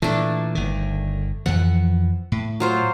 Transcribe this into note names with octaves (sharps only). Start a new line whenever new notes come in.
A#2 E3 A3 D4
G1 D#3
F2 E3 F3 F#5
A2
F#3 F4 C5